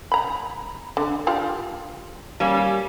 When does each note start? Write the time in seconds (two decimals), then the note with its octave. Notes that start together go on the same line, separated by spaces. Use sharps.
0.12 A#5 B5
0.97 D3
1.27 D4 F4 G4
2.40 G3 A#3 C#4